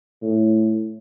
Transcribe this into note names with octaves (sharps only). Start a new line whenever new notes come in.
A2